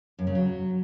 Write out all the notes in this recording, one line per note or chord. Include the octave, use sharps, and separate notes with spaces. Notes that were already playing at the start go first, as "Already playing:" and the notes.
F#2
C#3
F#3